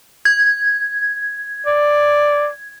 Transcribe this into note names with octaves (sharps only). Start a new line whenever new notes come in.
G#6
D5